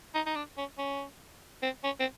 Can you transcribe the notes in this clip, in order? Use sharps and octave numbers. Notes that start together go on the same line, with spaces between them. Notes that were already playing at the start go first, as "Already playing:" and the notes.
D#4
D#4
D4
C#4
C#4
C4
C#4
C4